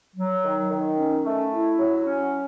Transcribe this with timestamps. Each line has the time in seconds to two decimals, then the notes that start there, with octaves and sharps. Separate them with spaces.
0.16 F#3
0.44 D#3
0.71 D#3
0.97 C#4
1.25 A3
1.52 E4
1.79 F#3
2.06 C#4